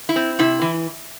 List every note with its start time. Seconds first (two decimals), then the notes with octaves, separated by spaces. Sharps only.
0.09 E4
0.16 C4
0.39 C3 E4
0.62 E3